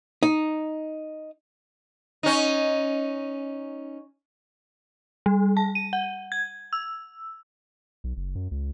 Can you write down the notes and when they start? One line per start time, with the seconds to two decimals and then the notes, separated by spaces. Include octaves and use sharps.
0.23 D#4
2.23 C#4 D#4
5.26 G3
5.57 A5
5.75 D#7
5.93 F#5
6.32 G#6
6.73 E6
8.04 B1
8.17 F#1
8.35 F#2
8.51 C#2